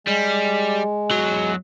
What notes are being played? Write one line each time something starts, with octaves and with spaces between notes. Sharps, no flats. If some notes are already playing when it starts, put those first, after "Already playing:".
G3 G#3
E2 F#3